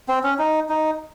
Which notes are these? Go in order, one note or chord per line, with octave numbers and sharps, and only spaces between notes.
C4
C#4
D#4
D#4